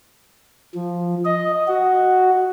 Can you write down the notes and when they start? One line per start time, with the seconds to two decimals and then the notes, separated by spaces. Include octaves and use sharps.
0.75 F3
1.25 D#5
1.68 F#4